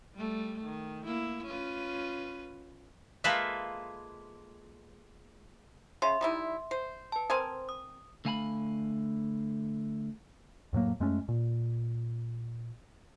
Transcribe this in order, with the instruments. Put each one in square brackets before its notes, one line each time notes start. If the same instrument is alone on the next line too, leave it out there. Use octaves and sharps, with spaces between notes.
[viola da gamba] G3 A3
D#3
A#3 E4
C#4 F4 B4
[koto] G#3 A#3 F4 A4 B4 E5
[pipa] C#3 [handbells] E5 C6
[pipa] G3 D#4 E4
C5
[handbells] B4 A5
[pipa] C4 A#4 G#5 [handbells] C5 C6 D#6
[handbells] D#6
[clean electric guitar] D3 A3 F5 G#5 A#5 B5
[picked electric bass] F2 A2 F#3 A#3
F#2 G#3 A3 C#4
A#2